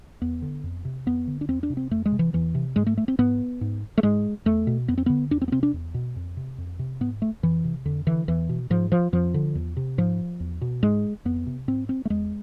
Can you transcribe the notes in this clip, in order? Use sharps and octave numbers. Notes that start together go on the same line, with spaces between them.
E2 B3
D3
F2
C3
F2 B3
D3
D4
E2 C4
D4
C3
C4
F2 A3
G#3
C3
E3
E2 E3
C3
G#2 G#3
A3
A3
C4
G#2 B3
G#2
A3
G#2 G#3
E2 A3
B2
F2 B3
C4
D3 B3
E2 D4
C4
B3
C3 C4
D4
E2
B2
F2
C3
F2
C3
G#2 B3
A3
F2 E3
C3
F2 D3
D3 E3
E2 E3
B2
G#2 F3
F3
F2 F3
D3
E2
C3
G#2 F3
E2
B2
G#2 G#3
F2 B3
C3
G#2 C4
C4
A3
E2 G#3